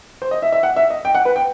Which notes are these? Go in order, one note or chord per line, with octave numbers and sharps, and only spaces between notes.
C5
D#5
E5
E5
F#5
E5
D#5
G5
F#5
B4
G5